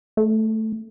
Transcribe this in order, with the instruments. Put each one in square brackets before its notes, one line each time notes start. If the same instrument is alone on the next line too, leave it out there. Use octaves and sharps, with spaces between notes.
[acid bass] A3